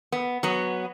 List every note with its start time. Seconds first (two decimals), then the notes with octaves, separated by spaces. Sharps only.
0.12 B3
0.43 F#3 B3